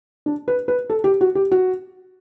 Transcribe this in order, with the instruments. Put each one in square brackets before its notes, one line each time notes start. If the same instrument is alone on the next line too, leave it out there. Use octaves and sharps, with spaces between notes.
[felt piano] D4
B4
B4
A4
G4
F#4
G4
F#4